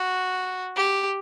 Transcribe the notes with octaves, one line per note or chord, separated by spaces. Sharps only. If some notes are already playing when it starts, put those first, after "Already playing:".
Already playing: F#4
G4